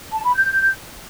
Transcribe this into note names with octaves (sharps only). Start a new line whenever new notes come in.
A5
B5
G6